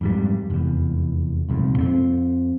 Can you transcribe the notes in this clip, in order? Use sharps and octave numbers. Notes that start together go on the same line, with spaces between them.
F2 G#2 G3
F1 E2
D#1 C2 F2 G#2
F2 B3 C4